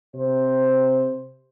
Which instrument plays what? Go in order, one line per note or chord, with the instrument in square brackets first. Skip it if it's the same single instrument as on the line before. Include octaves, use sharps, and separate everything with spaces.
[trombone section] C3 C5